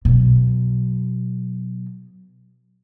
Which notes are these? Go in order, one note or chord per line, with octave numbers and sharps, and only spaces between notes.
B2 F#3